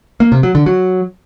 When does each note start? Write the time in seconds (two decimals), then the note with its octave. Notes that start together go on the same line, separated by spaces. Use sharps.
0.20 A#3
0.32 C3
0.43 F#3
0.55 D3
0.66 F#3